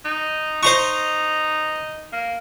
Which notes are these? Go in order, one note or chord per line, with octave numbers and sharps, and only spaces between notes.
D#4
D#4 C5 A#5 C#6
A#3